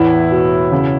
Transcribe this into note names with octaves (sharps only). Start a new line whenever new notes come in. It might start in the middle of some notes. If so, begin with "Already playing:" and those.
Already playing: E2 A2 E3 E4
B2
C#3